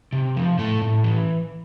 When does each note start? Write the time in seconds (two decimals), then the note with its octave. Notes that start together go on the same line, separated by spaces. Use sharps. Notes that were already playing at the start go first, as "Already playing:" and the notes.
0.12 C3
0.36 F3
0.59 A2 A3
0.82 A2
1.04 E3